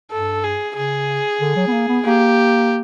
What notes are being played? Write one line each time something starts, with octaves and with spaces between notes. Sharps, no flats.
G2 A4
G#4
C#3 G#4
D3
F#3
B3
A#3
B3
A#3 G4